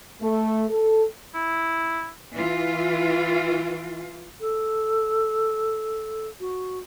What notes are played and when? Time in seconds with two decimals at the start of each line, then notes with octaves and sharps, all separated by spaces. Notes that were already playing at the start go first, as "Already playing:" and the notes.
0.21 A3
0.69 A4
1.35 E4
2.33 E3 F4
4.40 A4
6.41 F#4